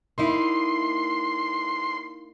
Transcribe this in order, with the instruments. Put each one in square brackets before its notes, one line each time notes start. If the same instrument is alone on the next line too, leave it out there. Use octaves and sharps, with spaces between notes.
[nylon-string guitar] A#3 D#4 E4 [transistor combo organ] C6